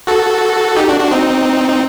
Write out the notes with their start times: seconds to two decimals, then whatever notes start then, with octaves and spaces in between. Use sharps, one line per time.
0.07 F#4 A4
0.77 D#4 G4
0.89 D4 F#4
1.00 D4 F#4
1.11 C4 D#4
1.69 D#4